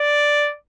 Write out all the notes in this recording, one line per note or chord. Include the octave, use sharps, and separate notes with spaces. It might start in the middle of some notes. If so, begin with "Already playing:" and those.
Already playing: D5